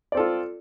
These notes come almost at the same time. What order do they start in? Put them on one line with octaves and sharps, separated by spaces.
D5 C4 A4 F4